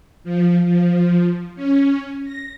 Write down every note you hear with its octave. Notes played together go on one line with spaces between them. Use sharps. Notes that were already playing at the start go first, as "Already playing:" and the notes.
F3
F3
C#4
A#6